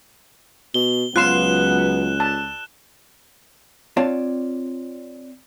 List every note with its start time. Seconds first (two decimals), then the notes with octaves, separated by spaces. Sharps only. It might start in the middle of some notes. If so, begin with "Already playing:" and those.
0.74 B2 G7
1.16 C#2 F#3 B3 F4 C6 F#6 E7
2.20 A5
3.97 C4 F4 C#5 D5 A5